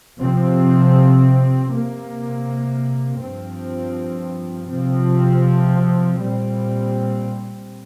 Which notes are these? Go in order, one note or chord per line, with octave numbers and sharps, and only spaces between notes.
C3 F3 C4
C3 A#3
G2 F3 C4
C3 F3 C4
A#2 G3 C4